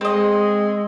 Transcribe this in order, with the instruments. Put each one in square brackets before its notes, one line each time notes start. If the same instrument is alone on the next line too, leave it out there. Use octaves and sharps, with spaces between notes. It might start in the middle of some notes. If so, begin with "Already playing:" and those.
[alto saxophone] G#3 [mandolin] C4 D#5